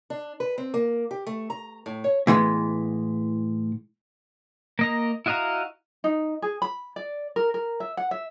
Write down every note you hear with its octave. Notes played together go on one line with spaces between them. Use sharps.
D4
B4
C4
A#3
G4
A3
A#5
A2
C#5
A2 E3 G#3 B3
A#3 D#5 A#5
E4 F#4 D#5 F5 A#5
D#4
G#4
B5
D5
A#4
A#4
E5
F#5
E5